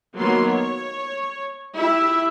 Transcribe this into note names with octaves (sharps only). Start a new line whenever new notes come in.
D#3 F#3 A#3 B3 C6
C#5
E4 G4 E5